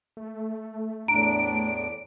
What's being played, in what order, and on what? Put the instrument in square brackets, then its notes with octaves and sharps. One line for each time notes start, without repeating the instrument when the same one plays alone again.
[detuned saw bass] A3
[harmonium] E2 A2 D4 [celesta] A#5 [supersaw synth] D7